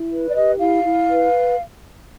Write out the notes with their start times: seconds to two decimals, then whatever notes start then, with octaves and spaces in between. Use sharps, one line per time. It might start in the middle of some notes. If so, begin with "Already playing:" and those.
Already playing: E4
0.10 B4
0.28 D5
0.35 G4 D#5
0.59 E4 F5
0.83 E4
1.08 B4